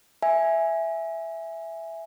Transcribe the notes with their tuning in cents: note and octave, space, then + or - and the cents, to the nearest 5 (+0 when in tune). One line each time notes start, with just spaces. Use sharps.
E5 +0 G#5 +0